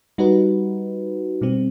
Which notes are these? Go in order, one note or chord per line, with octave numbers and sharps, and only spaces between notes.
G3 D#4 F#4 B4
B2 G3 C4